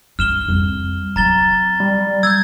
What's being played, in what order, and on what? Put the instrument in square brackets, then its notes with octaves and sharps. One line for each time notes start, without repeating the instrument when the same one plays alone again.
[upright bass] G2 [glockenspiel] F6 E7 G7
[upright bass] F2 G3
[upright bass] F#3 C4 [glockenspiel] A#5 A6 G7
[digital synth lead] G3
[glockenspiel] E6 G6 [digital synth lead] G#6